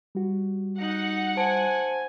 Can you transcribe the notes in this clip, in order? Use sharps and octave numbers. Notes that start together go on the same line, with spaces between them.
G3 F#4
D#4 F#5
C5 G#5 A5 D7